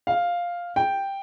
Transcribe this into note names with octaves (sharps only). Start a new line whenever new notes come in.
F5
G5